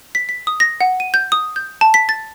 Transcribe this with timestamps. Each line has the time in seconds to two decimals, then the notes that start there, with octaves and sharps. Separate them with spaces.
0.15 B6
0.29 B6
0.47 D#6
0.60 A#6
0.81 F#5
1.00 D#7
1.14 G6
1.32 D#6
1.56 G6
1.81 A5
1.94 B6
2.09 A6